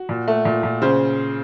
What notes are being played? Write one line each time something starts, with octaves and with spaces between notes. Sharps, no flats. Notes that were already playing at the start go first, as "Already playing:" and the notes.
Already playing: F#4
A#2
A3
A#2
A#2
C#3 C5